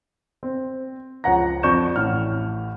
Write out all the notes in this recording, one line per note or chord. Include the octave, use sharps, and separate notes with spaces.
C4
C#2 F3 C#5 F#5 A#5 A#6
F2 D5 C#6 G6 E7
A1 A2 F6